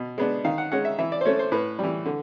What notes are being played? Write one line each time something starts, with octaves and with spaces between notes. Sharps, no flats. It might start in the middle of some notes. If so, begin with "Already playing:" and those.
Already playing: B2
G#3 B3 D4
D#3 F5
F#5
G#3 C#4 F#5
E5
E3 E5
D5
C5
A3 C#4 C#5
C5
A2 B4
E3 G3
D3